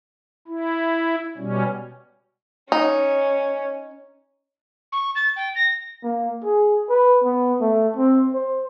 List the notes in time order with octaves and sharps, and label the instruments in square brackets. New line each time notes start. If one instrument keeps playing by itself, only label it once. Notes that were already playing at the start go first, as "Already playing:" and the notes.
[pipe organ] E4
B2 G3 C#4
[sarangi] C#4 [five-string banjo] D#4
[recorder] C#6
A6
G5
A#6
[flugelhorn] A#3
G#4
B4
B3
A3
C4
C5